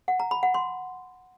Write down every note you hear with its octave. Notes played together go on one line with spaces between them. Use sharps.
F#5
A#5
B5
F#5
C6